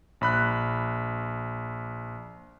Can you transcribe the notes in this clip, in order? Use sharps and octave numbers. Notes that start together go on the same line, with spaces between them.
A#1 B5 F#6